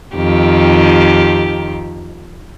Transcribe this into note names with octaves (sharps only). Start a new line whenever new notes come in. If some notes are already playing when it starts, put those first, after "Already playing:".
F2 D#3 G4